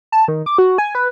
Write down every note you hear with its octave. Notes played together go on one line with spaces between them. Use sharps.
A5
D#3
D6
F#4
G#5
B4